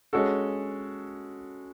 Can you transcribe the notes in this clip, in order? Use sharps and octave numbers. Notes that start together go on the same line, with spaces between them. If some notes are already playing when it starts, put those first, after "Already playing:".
G#3 C#4 F#4 A4